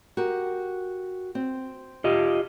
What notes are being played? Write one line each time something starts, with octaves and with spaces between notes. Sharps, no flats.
F#4 G4 A#4
C4
F4 G4 D#5